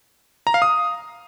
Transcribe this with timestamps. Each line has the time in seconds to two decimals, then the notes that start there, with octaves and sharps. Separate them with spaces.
0.47 A#5
0.54 F5
0.62 D#6